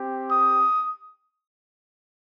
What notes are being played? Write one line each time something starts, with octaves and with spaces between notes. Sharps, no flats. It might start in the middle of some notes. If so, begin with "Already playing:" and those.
Already playing: C4 G4
D#6